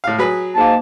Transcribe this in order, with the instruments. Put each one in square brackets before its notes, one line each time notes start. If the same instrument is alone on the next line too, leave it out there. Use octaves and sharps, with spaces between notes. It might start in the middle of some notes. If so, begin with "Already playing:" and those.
[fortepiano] A2 F5
F#3 G#4 B4
[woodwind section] G#2 A#3 A5